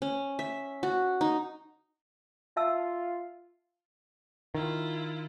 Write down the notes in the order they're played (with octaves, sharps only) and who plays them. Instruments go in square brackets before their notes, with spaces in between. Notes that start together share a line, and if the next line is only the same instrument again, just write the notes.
[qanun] C#4
E5
F#4
D#4
[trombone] F4 [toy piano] E5 A5 E6
[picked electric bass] D#3 [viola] E4 F4